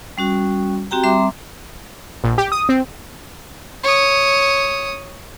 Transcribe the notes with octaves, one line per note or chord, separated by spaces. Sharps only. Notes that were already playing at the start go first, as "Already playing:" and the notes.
G3 C#4 F#4
C4 F#4 G4 G5 A#5
G3 C4 E5 A#5 C6 D6
A#1
G4
D#6
C4
C#5 D#6